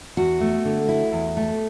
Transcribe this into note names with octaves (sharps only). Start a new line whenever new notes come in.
E2 F#4
A3
D3
E4
E2
A3